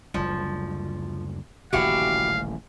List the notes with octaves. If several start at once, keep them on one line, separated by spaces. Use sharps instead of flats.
F#1 D2 F3 G3
D#1 A1 C#3 E4 F#4 G4 F5